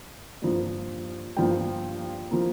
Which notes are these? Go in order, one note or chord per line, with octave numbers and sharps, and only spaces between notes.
G2 F3 A#3
G2 F3 A#3 G5
F3 A#3